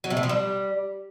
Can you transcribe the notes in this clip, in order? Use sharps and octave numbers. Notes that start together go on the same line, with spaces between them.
F#3
C3
A2
F3
G3